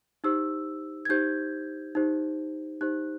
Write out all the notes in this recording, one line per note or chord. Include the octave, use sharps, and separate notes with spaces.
D#4 G4 C5 E6
G#6
D#4 G4 C5 G6
D#4 G4 C5
D#4 G4 C5 F#6